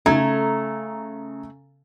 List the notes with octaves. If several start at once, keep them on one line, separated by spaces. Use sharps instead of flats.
C#3 A3 A#5 G#6